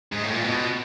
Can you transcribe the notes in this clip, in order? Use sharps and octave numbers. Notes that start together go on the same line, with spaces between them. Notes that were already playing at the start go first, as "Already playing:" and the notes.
G#2
A2
A#2
B2